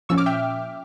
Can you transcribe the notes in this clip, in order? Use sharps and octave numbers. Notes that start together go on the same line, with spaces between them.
A#2 F3 C#4 C#6 E6
D6 F6
E5 G5